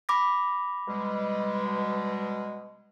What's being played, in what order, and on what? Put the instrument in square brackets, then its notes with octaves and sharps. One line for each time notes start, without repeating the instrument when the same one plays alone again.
[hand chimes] B5 D6 A#6
[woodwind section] B2 G3 G#3